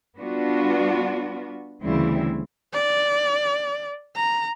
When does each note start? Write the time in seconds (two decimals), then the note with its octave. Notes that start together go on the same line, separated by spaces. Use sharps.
0.18 G3 B3 D4 F4 F#4
1.83 D2 C#3 E3 G3 C4 E4
2.73 D5
4.16 A#5